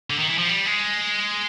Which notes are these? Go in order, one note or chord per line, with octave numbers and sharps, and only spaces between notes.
D3
D#3
E3
F3
G3
G#3